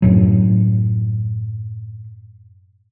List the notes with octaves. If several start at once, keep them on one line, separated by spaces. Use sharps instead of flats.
F#2 A2 F#3